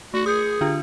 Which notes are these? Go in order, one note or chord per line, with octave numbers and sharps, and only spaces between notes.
A3 F#4 C#7
G#4 D#6 G6 C#7
D3 D4 F4